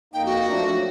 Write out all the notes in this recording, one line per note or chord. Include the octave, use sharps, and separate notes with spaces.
F2 A#3 D#4 G5
F#4
F3 A3 D4
F#3